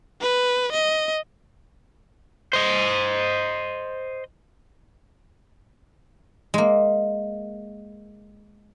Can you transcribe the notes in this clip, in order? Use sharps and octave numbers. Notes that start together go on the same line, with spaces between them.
B4
D#5
C5 D#5
G#3 A#3